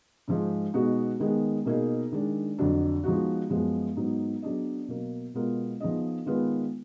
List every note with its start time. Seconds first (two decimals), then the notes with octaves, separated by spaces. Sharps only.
0.28 G#2 F3 G#3
0.74 B2 G#3 B3 D#4 F#4
1.20 D#3 G#3 B3
1.65 B2 A#3 D#4 G#4
2.12 D#3 G#3 D4
2.58 F2 D3 F#3 D4
3.04 F3 G#3 B3 D#4 F#4
3.49 F#2 F3 G#3 B3
3.96 G#2 F#3 B3 D#4
4.42 F#3 B3 D4 G#4 D#5
4.88 B2 F#3 A#3
5.34 B2 G#3 B3 F4 A#4
5.80 F3 B3 D#4 G#4 D#5
6.26 D#3 G#3 B3 F4 B4